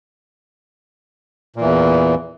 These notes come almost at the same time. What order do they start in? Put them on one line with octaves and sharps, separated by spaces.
A#2 E3 E2